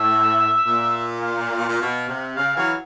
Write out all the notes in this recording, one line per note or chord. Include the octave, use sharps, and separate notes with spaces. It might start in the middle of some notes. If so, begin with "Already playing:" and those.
Already playing: A2 E5
A#2
F5
A#2
B2
C3
C#3 F5
E3 F#3 F5